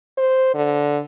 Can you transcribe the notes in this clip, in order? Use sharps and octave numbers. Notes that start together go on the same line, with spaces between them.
C5
D3